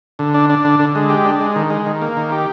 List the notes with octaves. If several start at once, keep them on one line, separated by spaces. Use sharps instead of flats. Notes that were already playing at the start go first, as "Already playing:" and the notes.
D3
D4
D4
D3
D3
G#3
G4
D4
G#3
D#3
G#3
D#3
A#3
D#3
G4